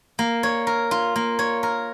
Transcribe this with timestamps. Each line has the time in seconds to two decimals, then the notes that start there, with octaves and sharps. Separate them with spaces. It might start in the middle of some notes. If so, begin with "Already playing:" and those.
0.19 A#3
0.43 C#5
0.67 A#4
0.91 F4
1.16 A#3
1.39 C#5
1.63 A#4